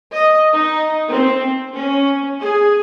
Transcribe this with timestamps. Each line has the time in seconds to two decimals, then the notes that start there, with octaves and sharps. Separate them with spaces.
0.11 D#5
0.52 D#4
1.08 C4
1.72 C#4
2.38 G#4